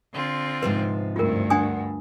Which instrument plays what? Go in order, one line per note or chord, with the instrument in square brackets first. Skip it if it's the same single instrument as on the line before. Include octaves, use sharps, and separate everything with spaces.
[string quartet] D3 C4 F4
[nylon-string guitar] G#2 C3 F3 [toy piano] B4
[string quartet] D2 G2 [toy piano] F4 A#4
[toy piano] D4 G#5 D#6 [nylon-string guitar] F#5